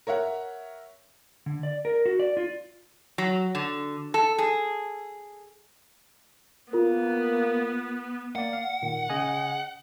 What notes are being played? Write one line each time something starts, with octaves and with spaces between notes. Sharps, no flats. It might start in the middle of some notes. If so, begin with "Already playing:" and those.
A#4 C#5 E5 F#5
D3
D5
A#4
F#4
D5
F4
F#3
D3
A4
G#4
A#3 B3 F4 A#4
A#3 D5 F#5
F5
A#2 D#3
C#3 D#5 G#5